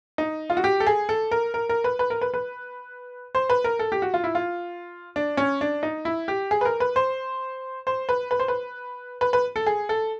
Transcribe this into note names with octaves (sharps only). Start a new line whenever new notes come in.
D#4
F4
F#4
G4
A4
G#4
A4
A#4
A#4
A#4
B4
B4
A#4
B4
B4
C5
B4
A#4
A4
G4
F#4
F4
E4
F4
D4
C#4
D4
D#4
E4
G4
G#4
B4
A#4
B4
C5
C5
B4
B4
C5
B4
B4
B4
A4
G#4
A4